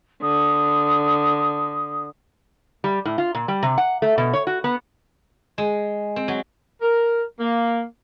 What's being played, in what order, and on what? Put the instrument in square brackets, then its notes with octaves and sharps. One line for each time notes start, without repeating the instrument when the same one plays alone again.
[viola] D3 [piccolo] D#6
[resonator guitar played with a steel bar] G3
A2
F4
A#2
G3
C3
F#5
A3
B2
C#5
F#4
B3
[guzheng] G#3
C4
F#3
[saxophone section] A#4
A#3